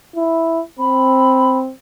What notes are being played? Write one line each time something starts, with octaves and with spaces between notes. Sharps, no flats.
E4
C4 B5